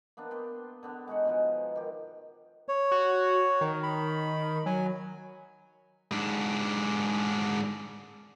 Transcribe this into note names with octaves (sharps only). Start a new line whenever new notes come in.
A#3 B3 D4
B3 G4 C6
D3 B3 D4
G#3 D#4 F#4 F#5
B2 F3 G#3
D#3 G4
C#5
F#4
D#3
B5
F#3 G#5
G#2 D4